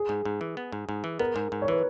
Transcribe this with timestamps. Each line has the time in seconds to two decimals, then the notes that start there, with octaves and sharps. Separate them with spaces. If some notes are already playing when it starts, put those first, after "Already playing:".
Already playing: G#4
0.09 G#2
0.25 G#2
0.41 E3
0.57 B3
0.72 G#2
0.89 G#2
1.04 E3
1.19 B3 A#4
1.36 G#2
1.52 G#2
1.62 C#5
1.68 E3 B4